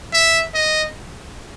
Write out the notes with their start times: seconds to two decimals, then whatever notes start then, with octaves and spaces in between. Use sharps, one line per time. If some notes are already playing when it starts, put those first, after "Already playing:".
0.13 E5
0.54 D#5